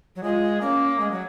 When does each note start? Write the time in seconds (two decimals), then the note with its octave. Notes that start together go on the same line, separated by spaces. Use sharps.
0.16 F#3
0.23 G#3 F4
0.61 A#3 C#4
1.00 G#3
1.11 F#3